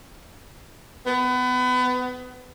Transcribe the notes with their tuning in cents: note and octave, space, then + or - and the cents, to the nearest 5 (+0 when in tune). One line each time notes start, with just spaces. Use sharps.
B3 +25